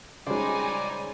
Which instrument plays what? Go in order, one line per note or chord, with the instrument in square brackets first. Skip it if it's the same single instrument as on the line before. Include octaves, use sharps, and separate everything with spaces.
[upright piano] C#3 G#3 [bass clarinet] G3 [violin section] D#4 G#5 [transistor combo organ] C5 D5